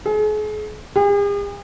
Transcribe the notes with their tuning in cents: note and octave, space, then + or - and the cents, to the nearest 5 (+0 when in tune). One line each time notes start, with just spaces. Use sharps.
G#4 +40
G#4 -45